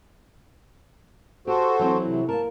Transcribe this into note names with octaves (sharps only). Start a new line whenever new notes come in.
F#4 G4 A4 C5
E3 F#3 C4
C3
A#3 A#4 A5